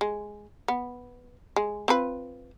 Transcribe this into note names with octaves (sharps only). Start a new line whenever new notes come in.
G#3
B3
G#3
C4 F4 B4